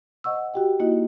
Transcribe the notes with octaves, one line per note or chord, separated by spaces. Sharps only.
C5 D#5 F#5 C#6 E6
F#4 G4 G5
A#3 D#4 E4 F#4 D#5